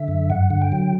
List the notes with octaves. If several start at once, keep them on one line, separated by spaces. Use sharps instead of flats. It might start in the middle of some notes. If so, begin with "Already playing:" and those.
Already playing: D3 E5
F#2
G2 F#5
D3
G5
F#3